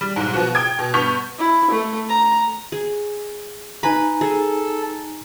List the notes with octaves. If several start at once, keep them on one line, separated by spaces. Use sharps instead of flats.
G3
B1 G#2
B2 F3 F#4
G5 D#6 G#6
B2
G2 B3 C#6 G6 B6 F7
E4
A3
A#5
G#4
D#4 B4 G#5 A#5 B5
G#4 A4